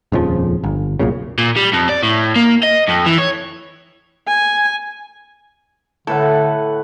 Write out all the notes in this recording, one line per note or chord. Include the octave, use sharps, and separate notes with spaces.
D#1 F2 C#3 F3
G1
C2 F#2 A#2 C#3
A#2
G3
F2
D5
A2
A#3
D#5
F2
E3
C#5
G#5
A2 D3 A4 B4 F#5